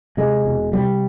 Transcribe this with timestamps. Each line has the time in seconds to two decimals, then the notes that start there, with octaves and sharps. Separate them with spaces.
0.17 C3 G#3
0.45 E1
0.73 C3 G3